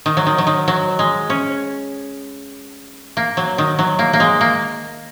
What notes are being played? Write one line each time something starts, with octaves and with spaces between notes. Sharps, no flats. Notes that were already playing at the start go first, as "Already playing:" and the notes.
D#3
F#3
D#3
F#3
D#3
F#3
G#3
C#4
A#3
F#3
D#3
F#3
A#3
A#3
G#3
A#3